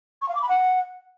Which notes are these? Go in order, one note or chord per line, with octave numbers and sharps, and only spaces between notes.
C#6
F5
D6
B5
F#5